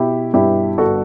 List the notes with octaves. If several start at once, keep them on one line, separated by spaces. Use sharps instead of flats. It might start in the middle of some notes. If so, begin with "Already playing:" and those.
Already playing: B2 E4 G4
G2 E4 G4
G1 F#4 A4